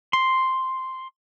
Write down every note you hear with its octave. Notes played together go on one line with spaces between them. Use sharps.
C6